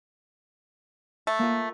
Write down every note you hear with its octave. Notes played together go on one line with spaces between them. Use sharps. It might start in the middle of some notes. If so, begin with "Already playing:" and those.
A3
A#3 F4